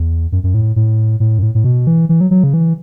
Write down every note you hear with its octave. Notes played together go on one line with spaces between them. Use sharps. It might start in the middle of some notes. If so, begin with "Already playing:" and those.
Already playing: E2
F#2
F#2
A2
A2
A2
F#2
A2
A2
B2
E3
E3
F#3
F#3
C#3
E3